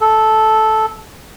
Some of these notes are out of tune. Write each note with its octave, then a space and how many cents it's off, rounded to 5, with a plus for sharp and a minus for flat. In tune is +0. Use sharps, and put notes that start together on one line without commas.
A4 -10